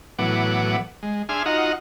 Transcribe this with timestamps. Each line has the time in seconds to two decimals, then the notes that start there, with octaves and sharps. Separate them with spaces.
0.19 A2 E3 F#3 B3 F#5 D6
1.03 G#3
1.29 D4 G#4 E5 G#5 C6 F6
1.46 D#4 F4 F#4 D#5 F#5 A#5